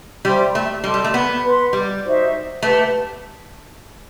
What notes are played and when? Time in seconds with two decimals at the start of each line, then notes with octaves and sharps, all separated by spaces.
0.25 G3 C5 E5 G5 C6
0.55 A3
0.84 G3 A4 D#5 A5 C6
0.94 G3
1.04 A3
1.14 B3
1.43 B4 F#5 C6
1.73 G3
2.02 D#4 F#4 C5 E5
2.62 A3 G4 B4 F#5